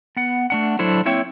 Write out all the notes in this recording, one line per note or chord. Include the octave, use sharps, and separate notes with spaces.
B3 F#5
A3 D4 F#5
F#3 D4 E4 A4 C5
A#3 C4 E4 C#5 E5 G5